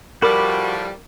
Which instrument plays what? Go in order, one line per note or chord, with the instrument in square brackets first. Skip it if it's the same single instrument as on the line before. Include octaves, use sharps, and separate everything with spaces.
[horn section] A2 F3 G3 [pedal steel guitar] F#4 B5 D6 [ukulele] A#4